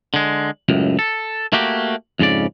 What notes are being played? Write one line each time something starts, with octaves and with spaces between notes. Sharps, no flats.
D3 G#3
C#2 F#2 A2
A4
A3 A#3 F#4 G4
F2 G#2 C#3 D5